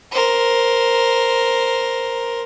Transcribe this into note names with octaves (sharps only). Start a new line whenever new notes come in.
A#4 C5